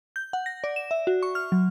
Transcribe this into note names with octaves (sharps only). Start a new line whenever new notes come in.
G6
F#5
A#6
D5
E7
E5
F#4
C#6
F6
F#3